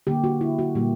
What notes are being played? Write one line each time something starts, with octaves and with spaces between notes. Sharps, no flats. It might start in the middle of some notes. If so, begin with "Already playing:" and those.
D3 A#3 G4
F#4
E4
F#4
A#2 G3 A#3 G4